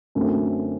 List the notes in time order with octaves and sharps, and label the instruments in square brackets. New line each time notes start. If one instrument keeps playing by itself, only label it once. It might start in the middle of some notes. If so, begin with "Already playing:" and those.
[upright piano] F#2 D3 A3 C4